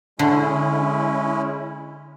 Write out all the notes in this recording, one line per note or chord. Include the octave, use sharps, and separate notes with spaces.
D3 G#3 C#4 E4